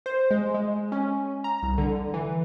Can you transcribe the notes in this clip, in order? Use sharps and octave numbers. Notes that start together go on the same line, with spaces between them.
C5
G#3
G#3
C#4
A#5
C2
D3
E3